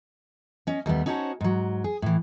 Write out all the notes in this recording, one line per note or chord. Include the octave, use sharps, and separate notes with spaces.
C#4 D#5
D#2 G3 A3 B3
C#4 D#4 F#4 C5 C#5 A5
G#2 F#3
G#4
A2 E3